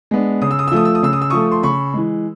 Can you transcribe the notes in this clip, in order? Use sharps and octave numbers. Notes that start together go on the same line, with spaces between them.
G#3 B3 D4
C#3 D#6
E6
D#6
E6
F3 A3 D#6
E6
D#6
C#3 E6
D#6
E6
F3 A3 C#6 D#6
C6
C#3 B5 C#6
E3 G#3